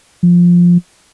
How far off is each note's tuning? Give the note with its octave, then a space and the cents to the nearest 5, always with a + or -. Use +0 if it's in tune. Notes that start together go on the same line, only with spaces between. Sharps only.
F3 +5